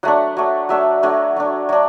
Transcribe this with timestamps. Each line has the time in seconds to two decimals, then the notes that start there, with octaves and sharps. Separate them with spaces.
0.03 F#3 A3 D4 F#5
0.37 F#3 A3 D4
0.69 F#3 A3 D4 E5
1.03 F#3 A3 D4
1.36 F#3 D4
1.69 F#3 D4